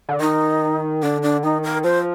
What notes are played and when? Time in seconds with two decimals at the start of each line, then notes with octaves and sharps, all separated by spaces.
0.09 D3
0.20 D#3 D#4
1.03 D3 D4
1.23 D4
1.43 D#3 D#4
1.64 A#4
1.84 F3 C5